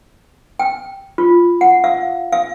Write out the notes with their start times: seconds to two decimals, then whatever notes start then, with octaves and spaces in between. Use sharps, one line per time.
0.59 G5
1.18 F4
1.61 F#5
1.84 F5
2.32 F5